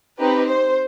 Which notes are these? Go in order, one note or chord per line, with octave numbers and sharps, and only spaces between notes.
C4 D#4 G4 B4
C5